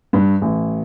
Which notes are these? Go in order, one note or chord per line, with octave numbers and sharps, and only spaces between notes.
G2
A1